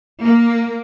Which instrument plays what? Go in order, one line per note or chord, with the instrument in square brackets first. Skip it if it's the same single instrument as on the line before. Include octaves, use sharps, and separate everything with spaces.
[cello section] A#3